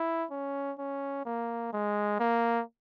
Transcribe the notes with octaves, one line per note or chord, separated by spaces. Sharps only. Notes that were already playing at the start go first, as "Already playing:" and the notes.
Already playing: E4
C#4
C#4
A#3
G#3
A#3